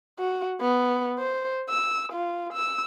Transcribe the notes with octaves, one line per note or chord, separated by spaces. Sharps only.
F#4
B3
C5
E6
F4
E6